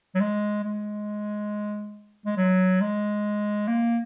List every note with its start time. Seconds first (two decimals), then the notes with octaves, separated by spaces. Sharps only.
0.15 F#3
0.20 G#3
0.64 G#3
2.26 G#3
2.37 F#3
2.81 G#3
3.68 A#3